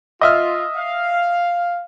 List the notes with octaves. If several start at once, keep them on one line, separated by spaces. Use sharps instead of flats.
F4 D#5 E5 F6
F5